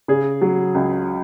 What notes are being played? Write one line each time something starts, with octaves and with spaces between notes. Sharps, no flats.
C#3 G#4
F#3
C#2